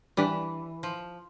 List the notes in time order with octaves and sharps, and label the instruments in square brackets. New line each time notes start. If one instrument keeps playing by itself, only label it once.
[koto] E3 [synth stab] G3 D4 G4 B4
[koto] F3